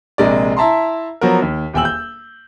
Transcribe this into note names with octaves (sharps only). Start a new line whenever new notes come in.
A#1 C3 G#3 A#4 D5
E4 E5 A5 A#5 C6
F3 F#3 B3 F#4 A#4
D#2
D#1 E2 G5 G#5 E6 F#7
G6